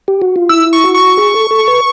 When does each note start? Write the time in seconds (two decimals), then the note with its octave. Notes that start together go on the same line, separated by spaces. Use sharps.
0.08 G4
0.22 F#4
0.36 F4
0.49 E4 E6
0.73 C#6
0.84 F#4
0.94 C#6
1.17 G#4
1.34 A4
1.51 A4
1.68 B4